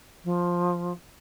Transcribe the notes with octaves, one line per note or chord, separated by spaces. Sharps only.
F3